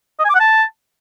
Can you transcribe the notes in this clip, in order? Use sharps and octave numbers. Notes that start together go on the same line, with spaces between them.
D#5
G#5
D6
F#5
A5